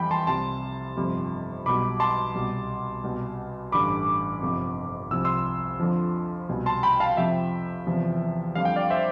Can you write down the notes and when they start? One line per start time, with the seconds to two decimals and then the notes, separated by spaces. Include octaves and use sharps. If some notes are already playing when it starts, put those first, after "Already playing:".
Already playing: F2 E3 G3 G5 B5
0.11 A5 C6
0.27 C2 C3 G3 A5 C6
0.97 G1 F2 C3 G3
1.66 B1 B2 G3 B5 D6
2.00 A5 C6
2.35 C2 B2 G3
3.04 C2 B2 G3
3.72 A1 G2 D3 G3 B5 D6
4.42 G1 F2 C3
5.11 C2 C3 F3 E6
5.25 C6 E6
5.79 F2 D3 F3
6.49 C2 B2 G3
6.66 A5 C6
6.83 G5 B5
7.00 F5 A5
7.17 F2 C3 F3 E5 G5
7.86 E2 C3 F3
8.55 F2 D3 G3 F5
8.65 G5
8.76 D5 F5
8.90 C5 E5